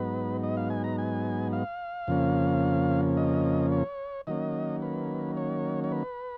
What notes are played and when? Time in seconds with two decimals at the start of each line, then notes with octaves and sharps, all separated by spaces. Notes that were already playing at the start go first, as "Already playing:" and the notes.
Already playing: G#2 F#3 B3 D#4 B4
0.43 D#5
0.57 F5
0.70 G#5
0.84 A#5
0.98 G#5
1.53 F5
2.07 F2 C#3 F3 A#3 C#4
3.17 D#5
3.72 C#5
4.27 D#3 F#3 A#3 C#4 D#5
4.82 B4
5.37 C#5
5.84 C#5
5.92 B4